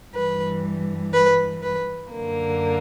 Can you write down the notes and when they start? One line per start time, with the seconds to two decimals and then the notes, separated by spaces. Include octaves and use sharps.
0.13 G2 E3 G3 B4
1.13 B4
1.62 B4
2.13 F#2 D3 A#3